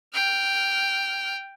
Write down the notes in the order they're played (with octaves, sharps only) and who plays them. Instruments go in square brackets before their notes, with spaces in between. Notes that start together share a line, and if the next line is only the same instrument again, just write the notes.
[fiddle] G5 F6